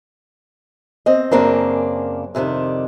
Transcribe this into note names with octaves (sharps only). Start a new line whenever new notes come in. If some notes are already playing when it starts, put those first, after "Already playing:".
C4 D#5
F#2 C#3 A#3 C4 D4
F2 C3 D#3 D4